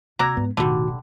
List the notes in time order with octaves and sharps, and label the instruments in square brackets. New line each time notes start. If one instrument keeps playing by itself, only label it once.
[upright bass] D#2 [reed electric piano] C3 E6 G#6 [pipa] F#4 D5 A#5
[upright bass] G#2 [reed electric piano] B3
[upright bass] F1 B1 [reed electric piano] A2 D#3 F#4 [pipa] D3 G3